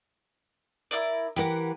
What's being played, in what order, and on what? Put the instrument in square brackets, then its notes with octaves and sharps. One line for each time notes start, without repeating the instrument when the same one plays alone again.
[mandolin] E4 A#4 D5
[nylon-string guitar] E3 A#4 [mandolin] G4 F#5